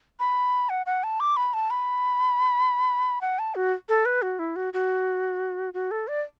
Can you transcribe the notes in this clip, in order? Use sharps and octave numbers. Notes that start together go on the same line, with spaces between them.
B5
F#5
F#5
A5
D6
B5
A5
B5
F#5
A5
F#4
A4
B4
F#4
E4
F#4
F#4
F#4
A4
D5